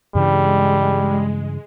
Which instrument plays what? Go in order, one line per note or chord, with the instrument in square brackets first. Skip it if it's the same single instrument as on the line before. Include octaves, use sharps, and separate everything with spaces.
[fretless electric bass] G2 C#3 E3 [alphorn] G3 [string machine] G#3